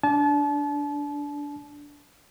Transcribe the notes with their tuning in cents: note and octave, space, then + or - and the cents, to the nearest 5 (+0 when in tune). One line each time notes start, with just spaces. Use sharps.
D4 -15 A5 -35